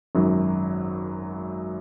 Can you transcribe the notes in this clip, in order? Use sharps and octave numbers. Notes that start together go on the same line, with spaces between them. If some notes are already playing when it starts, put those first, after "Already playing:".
G#1 F#2 F#3